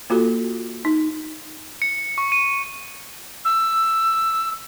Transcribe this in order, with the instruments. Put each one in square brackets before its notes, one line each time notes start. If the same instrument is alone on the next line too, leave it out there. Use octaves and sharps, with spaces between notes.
[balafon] A#3 F4 F#4 A4
D#4
[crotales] C#7
C#6
D#7
[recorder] E6